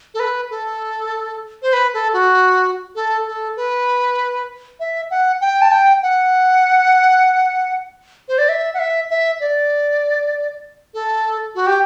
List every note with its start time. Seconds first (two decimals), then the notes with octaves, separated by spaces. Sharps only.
0.14 A4
0.20 B4
0.50 A4
1.62 C5
1.73 B4
1.94 A4
2.13 F#4
2.95 A4
3.27 A4
3.56 B4
4.80 E5
5.11 F#5
5.41 G5
5.62 A5
5.72 G5
6.03 F#5
8.28 C5
8.38 D5
8.49 E5
8.74 F#5
8.79 E5
9.10 E5
9.40 D5
10.94 A4
11.55 F#4
11.67 G4